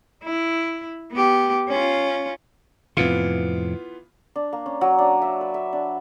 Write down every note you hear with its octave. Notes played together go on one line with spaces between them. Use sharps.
E4
B3 G4
C#4 F4
F2 A2 C3 E3 B3 F4
D4
A#3
C#4
F#3
D4
E5
B4
E5
D4